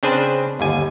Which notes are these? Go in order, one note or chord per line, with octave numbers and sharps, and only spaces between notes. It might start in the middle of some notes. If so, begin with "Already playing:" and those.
C#3 C4 D4 G#4 B4 C5
G1 D#2 G#5